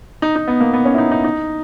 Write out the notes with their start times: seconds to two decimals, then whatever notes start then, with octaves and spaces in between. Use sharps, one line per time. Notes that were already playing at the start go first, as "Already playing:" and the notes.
0.22 D#4
0.36 D#4
0.48 B3
0.60 A#3
0.73 B3
0.85 C#4
0.94 E4
0.98 D#4
1.12 D#4
1.24 D#4